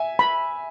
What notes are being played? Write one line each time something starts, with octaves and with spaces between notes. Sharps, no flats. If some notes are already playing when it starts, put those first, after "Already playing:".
Already playing: E5 G#5
B5